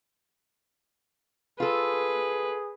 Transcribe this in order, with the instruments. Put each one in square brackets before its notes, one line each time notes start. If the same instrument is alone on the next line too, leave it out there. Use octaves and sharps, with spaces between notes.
[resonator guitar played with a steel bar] F4 A4 [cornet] G#4 [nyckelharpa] B4